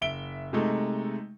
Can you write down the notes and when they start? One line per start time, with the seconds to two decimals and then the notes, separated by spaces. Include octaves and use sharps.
0.01 F#1 E5 D7 G7
0.53 C3 G#3 A3 D#4